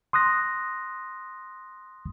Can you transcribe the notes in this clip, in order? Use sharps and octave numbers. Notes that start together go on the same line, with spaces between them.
C6 D#6 F#6 A#6